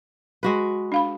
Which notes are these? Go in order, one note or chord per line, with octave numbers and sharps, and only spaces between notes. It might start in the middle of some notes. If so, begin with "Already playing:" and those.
G#3 F#4 B4
D4 F5 B5